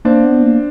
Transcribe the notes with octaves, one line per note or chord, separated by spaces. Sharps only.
A#3 C4 D4
B3
A#3